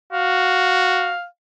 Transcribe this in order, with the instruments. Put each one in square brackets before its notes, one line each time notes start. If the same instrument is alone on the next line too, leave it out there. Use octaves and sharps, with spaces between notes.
[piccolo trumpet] F#4 [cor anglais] F5